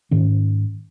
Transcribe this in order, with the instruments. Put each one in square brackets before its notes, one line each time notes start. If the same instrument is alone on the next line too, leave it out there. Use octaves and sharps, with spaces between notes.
[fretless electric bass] G#2 D#3 C#4